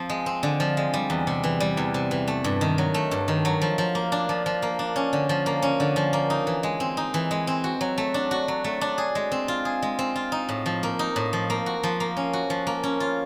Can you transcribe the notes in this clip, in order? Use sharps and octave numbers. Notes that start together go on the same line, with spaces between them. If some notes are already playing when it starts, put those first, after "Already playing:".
Already playing: F3 C4
G#3
C4
D3
F3
G#3
G3
E2
C3
E3
G3
E2
C3
E3
A3
G2
D#3
F#3
A3
G2
D#3
F#3
F3
F3
A#3
D4
F3
F3
A#3
D4
C#4
D3
F3
A#3
C#4
D3
F3
A#3
D#4
E3
G#3
C4
D#4
E3
G#3
C4
F#4
F#3
A3
D4
F#4
F#3
A3
D4
G#4
G#3
C4
F4
G#4
G#3
C4
F4
D#4
A2
F3
A#3
D#4
A2
F3
A#3
F#4
F3
A#3
C#4
F#4
F3
A#3
C#4
F4